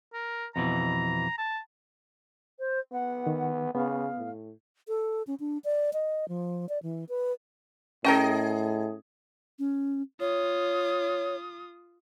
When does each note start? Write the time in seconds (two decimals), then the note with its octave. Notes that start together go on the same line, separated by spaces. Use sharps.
0.14 A#4
0.56 F2 B2 E3 A#5
1.38 A5
2.59 C5
2.92 B3 F#5
3.26 D#3
3.75 C#3 B3 F5
4.18 A2
4.88 A4
5.27 C#4
5.40 D4
5.65 D5
5.93 D#5
6.28 F3
6.69 D5
6.83 E3
7.09 B4
8.05 A2 C#4 G#4 A#4 D#5 G5 A5
9.59 C#4
10.20 F4 C#5 D#6